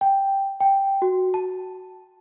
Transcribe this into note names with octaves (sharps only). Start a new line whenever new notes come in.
G5
G5
F#4
A5